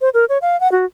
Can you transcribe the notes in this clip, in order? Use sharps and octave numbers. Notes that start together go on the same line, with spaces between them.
C5
A#4
C#5
F5
F#5
F#4